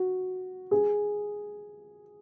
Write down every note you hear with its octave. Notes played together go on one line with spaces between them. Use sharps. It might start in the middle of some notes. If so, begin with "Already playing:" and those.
Already playing: F#4
G#4